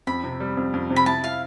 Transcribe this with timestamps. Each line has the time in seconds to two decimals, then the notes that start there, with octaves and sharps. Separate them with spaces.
0.07 F2 B5
0.24 C3
0.40 G3
0.57 F2
0.74 F2
0.91 C3
0.96 B5
1.06 E4 A5
1.23 E4 F5